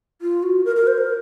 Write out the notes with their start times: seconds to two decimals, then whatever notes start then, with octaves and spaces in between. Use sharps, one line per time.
0.21 F4
0.43 F#4
0.65 A#4
0.76 A#4
0.87 C5
0.98 A#4